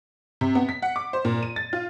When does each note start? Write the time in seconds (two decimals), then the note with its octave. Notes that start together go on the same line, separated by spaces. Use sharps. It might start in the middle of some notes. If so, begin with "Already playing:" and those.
0.41 C3
0.55 B3
0.69 B6
0.82 F#5
0.96 D6
1.13 C5
1.25 A#2
1.43 D#7
1.56 A6
1.73 F4